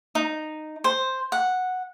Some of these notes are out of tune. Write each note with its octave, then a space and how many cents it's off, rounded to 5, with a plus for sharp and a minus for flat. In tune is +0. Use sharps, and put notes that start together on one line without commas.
D#4 -10
C5 +5
F#5 -5